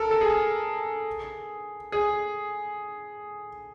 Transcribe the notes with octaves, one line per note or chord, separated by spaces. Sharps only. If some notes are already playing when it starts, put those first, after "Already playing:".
Already playing: A4 A#4
A4
G#4
G#4